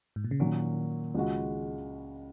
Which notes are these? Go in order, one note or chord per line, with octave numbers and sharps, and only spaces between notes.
G#2
A#2
C#3
A#2 D#3 F#3 C#4
C#2 C#3 G#3 F#4